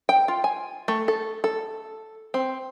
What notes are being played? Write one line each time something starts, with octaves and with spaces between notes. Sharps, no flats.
G5
F4
G#5
A3
A4
A4
C4